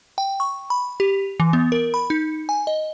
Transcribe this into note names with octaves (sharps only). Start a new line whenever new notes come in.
G5
C#6
B5
G4
E3
B3
A#4
B5
D#4
G#5
D#5